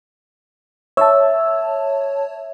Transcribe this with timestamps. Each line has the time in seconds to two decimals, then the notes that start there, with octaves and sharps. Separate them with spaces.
0.97 C#5 E5 A5